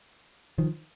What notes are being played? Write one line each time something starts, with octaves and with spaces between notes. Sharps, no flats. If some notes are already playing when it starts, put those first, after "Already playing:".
D#3 F3